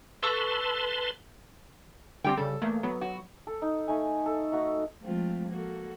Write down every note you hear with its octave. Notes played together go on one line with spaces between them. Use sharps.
A4 B4 A5 C6 C#6 E6
D3 G3 C4 G4 G5
C#3 G3 A4
E2 A3 A#3
F#3 B3
F#4
A4
D#4
A3 D#4 G#5
A4
A3 D#4 F#4
F3 G#3 A3 C4 F4
A#3 F#4 A4